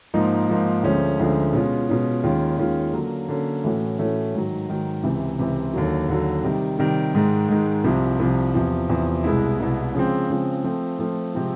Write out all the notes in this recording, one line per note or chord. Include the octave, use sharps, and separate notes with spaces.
G#2 F3 A#3 D#4
G#2 F3 A#3 D#4
D2 D3 F3 G#3 C#4
D2 D3 F3 G#3 C#4
B2 G#3 C#4 F4
B2 G#3 C#4 F4
D#2 D#3 G#3 C#4 F4
D#2 D#3 G#3 C#4 F4
D3 F#3 A#3 C#4
D3 F#3 A#3 C#4
A2 E3 A3 C#4 F#4
A2 E3 A3 C#4 F#4
G#2 D#3 F#3
G#2 D#3 F#3
C#2 C3 E3
C#2 C3 E3
D#2 D3 F#3
D#2 D3 F#3
C3 D#3 G3
C3 D#3 G3
G#2 D#3 G#3
G#2 D#3 G#3
C2 C3 F3
C2 C3 F3
E2 C3 F3
E2 C3 F3
C2 B2 G#3 B3 E4
C2 B2 G#3 B3 E4
C#3 F3 G#3 C4
C#3 F3 G#3 C4
F3 A3 C4 F4
F3 A3 C4 F4
C3 F3 G#3 C4